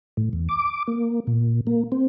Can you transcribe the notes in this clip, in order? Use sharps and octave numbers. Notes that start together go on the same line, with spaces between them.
A2
E2
D6
A#3
A#2
A#3
C4